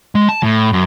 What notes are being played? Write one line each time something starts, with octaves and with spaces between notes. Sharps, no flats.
G#3
A5
A2
F#2